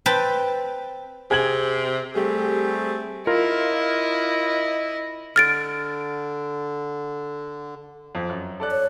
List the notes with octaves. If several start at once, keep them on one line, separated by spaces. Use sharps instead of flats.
C4 B4 G5 A5
C3 G#4 G#6 F#7
G3 A3 C4 G4 G#4
E4 F4 A#4 D#5
D3 F6 A6 D7
F2
F#2
A4 D5 F#6
C#5